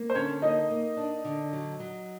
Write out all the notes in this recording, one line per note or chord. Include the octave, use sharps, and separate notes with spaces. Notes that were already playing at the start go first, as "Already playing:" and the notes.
Already playing: A#3
C5
D3 C#4 C#5
A#3 D#4 D#5
A#3
D4
D3
F#3
F#3